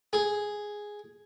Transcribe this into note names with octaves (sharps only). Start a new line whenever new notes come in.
G#4